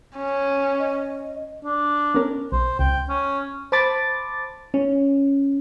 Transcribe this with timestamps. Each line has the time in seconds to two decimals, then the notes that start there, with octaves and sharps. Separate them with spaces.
0.17 C#4
0.79 D#5
1.64 D4
2.14 B3 C#4 A#4
2.52 B1 C5
2.79 C#2 G5
3.09 C#4
3.72 C5 A5 B5 D6 A6
4.74 C#4